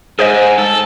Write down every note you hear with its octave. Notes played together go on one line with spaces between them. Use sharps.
G#2 G#4 C5 D#5
A4